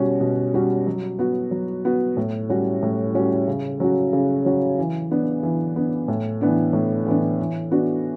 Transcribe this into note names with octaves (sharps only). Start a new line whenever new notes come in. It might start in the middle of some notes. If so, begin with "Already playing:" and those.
Already playing: B2 G3 C#4 F#4
B2
G3 C#4 F#4
F#3
B3 F#4
F#3
B3 F#4
A2
G3 C#4 F#4
A2
G3 C#4 F#4
C#3
F#3 C#4 F#4
C#3
F#3 C#4 F#4
E3
B3 D4
E3
B3 D4
A2
E3 B3 D4
A2
E3 B3 D4
E3
B3 D4 F#4